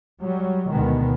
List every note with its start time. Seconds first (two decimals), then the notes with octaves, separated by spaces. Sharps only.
0.20 F#3 G3
0.70 D2 B2 D#3 G#3 B3